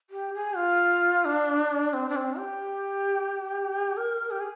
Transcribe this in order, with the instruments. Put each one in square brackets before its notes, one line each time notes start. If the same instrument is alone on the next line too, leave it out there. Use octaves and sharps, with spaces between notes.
[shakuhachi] G4
G#4
F4
D4
C4
D4
C4
G4
A#4
G4
G#4